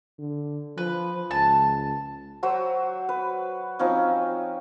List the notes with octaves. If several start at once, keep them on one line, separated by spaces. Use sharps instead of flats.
D3
F3 B4
C#2 A5
F#3 F#4 C5 E5
B4
F3 C4 C#4 D#4